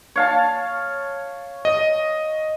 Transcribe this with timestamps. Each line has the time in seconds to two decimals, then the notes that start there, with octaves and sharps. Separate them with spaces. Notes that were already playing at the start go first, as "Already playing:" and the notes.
0.16 C#5 F5 A5
1.65 D#5